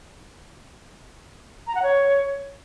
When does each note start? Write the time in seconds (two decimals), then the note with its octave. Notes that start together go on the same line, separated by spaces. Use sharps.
1.67 A#5
1.75 F#5
1.83 C#5